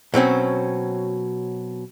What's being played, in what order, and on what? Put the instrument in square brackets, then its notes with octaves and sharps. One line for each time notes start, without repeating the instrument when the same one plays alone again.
[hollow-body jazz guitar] B2 F#3 C4 C#4